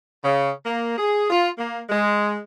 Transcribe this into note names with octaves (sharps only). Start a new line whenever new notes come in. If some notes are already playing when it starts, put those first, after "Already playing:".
C#3
A#3
G#4
F4
A#3
G#3